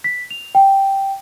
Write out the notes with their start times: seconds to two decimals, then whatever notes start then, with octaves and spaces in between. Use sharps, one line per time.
0.04 B6
0.31 F7
0.55 G5